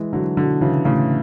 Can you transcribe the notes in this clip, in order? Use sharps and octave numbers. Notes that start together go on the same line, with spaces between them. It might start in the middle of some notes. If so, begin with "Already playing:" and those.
Already playing: E3 G#3
D3 F#3
B2 D3
C#3 E3
A2 C#3